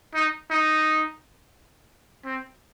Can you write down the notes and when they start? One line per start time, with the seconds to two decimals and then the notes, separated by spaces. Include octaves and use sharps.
0.14 D#4
0.50 D#4
2.25 C4